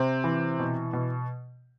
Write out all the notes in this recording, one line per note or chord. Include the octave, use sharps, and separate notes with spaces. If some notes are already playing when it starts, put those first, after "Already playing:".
Already playing: C3 C4
E3
B2
B2